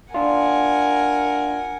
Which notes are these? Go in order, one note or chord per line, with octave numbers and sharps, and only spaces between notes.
D4 F4 A#4 F#5 G#5